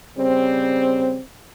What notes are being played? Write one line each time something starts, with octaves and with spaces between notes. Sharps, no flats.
C#3 G3 C4